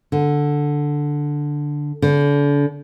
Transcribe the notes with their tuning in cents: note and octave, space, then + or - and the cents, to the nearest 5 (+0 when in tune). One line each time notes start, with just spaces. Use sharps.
D3 +0
D3 -35